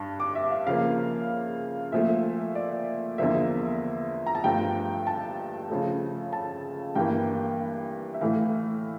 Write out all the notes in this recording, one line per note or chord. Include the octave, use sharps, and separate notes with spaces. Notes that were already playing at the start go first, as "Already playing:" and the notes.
Already playing: G2 A5
D6
E5
F5
C#3 F3 A#3 F5
A#2 F3 A3 E5
D5
E2 D3 F3 A#3 E5
A#5
A5
G2 F3 A3 G5
A5
C#3 F3 A3
A5
G2 E3 A#3 G5
E5
A2 E3 A3 F5